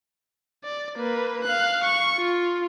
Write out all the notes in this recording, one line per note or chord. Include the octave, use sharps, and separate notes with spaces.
D5
A#3 B4
F5 F#6
C#6
F4